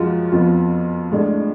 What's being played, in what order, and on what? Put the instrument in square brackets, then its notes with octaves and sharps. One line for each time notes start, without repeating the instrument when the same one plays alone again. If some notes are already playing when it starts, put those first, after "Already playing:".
Already playing: [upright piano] F#2 F3 G#3 F4 F#4
F2 F3 B3 F4
A2 G#3 D4